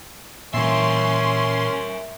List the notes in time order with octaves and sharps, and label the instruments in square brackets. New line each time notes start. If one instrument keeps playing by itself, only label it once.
[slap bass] A#2 E3 [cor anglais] C#4 [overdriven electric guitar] A#4 E5 [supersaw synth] C6